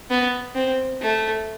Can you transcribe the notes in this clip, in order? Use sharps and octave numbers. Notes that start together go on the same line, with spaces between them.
B3
C4
A3